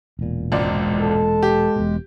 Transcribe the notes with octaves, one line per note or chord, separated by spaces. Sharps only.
E1 A#2
G#1 C#2 G#3 D5
A4
G4
E1 B2